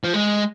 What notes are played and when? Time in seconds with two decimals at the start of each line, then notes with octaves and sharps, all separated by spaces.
0.04 F3
0.14 G#3